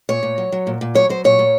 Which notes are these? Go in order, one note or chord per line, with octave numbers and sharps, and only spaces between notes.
A#2 C#5
A#2
F#3
F#3
A#2
A#2
F#3 C#5
F#3 C5
A#2 C#5
A#2